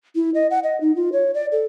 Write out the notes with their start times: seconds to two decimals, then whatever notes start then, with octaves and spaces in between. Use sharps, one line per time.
0.16 E4
0.34 D#5
0.51 F#5
0.64 D#5
0.81 D#4
0.96 F4
1.12 C#5
1.34 D5
1.52 A4